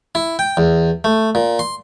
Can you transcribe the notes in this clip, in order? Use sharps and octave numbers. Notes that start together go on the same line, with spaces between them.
E4
G5
E2
A3
A#2
C6